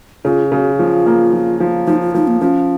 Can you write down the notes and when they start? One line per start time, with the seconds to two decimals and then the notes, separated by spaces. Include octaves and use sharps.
0.25 C#3 F4
0.52 C#3 F#4
0.79 F3 F4
1.06 A#3
1.33 F3
1.60 F3
1.87 F3 D#4
2.01 F4
2.15 F3 D#4
2.27 A#3
2.41 F3 C#4